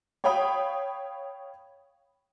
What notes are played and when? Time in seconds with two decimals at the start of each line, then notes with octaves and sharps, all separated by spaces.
0.24 C#5 F5 G5 B5 D#6